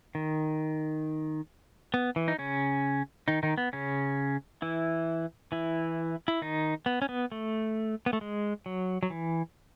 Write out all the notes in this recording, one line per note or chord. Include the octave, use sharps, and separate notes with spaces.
D#3
B3
E3
D#4
C#3 C#4
D#3 D#4
D#3 D#4
B3
C#3 C#4
E3 E4
E3 E4
E4
D#3 D#4
B3
C#4
B3
A3
B3
A3
G#3
F#3
F#3
E3